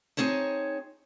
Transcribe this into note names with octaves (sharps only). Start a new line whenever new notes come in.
C4 D#4 G#4 C#5 A5